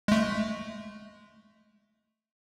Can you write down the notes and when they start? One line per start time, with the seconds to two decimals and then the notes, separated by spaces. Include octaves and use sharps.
0.08 G#3 A3